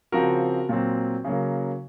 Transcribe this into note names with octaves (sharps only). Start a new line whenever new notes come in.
C#3 F3 C4 F#4 A#4
A#2 F#3 C4
C#3 F#3 A#3